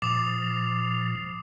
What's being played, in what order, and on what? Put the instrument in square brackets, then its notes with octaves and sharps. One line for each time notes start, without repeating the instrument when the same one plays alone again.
[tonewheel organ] A#2 F3 [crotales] D6 D#6 F7